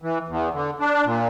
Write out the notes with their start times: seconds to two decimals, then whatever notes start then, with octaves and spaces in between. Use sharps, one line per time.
0.02 E3
0.29 E2
0.54 D3
0.80 D4
1.05 A#2